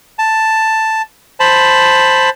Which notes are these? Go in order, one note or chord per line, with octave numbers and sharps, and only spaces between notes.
A5
C5 A5 B5